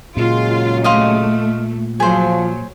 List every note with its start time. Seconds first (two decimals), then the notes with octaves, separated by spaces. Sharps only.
0.17 A#2 C#3 F#3 G#3 F4
0.84 A3 D#5 F5 C6
2.00 F3 F#3 G#4 C5